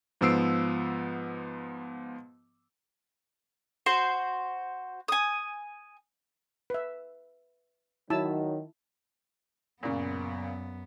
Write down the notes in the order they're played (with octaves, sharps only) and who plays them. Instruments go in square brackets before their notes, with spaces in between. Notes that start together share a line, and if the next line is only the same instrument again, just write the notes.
[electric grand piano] G#2 F3 B3 E6 C7 D7
[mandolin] F#4 C5 C6
G#5 D#6
[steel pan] B4 E5
[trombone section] D#3 F#3 [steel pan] E4 A5 E6
[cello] F#2 B3 [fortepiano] A#2 C#3